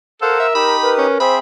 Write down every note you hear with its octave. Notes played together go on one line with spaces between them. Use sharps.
A4 A#4 C5 F5 F#5 E6
E5
D#4 G4 B5 D#6
A#4 B4
C#4
C4 G#4 C5 E5 B5